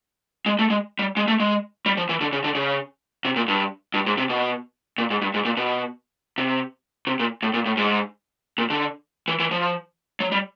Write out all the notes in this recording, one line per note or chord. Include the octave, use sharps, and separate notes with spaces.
G#3
A3
G#3
G3
G#3
A3
G#3
G3
F3
E3
D3
C#3
D3
C#3
C3
A#2
G2
G2
G#2
C3
B2
A#2
G#2
G2
G#2
A#2
B2
C3
C3
A#2
A2
A#2
A2
G#2
A#2
D3
E3
E3
F3
F#3
G3